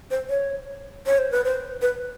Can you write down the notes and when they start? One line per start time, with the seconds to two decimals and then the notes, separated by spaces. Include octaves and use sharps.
0.11 C5
0.29 C#5
1.06 C#5
1.18 C5
1.31 B4
1.45 C5
1.82 B4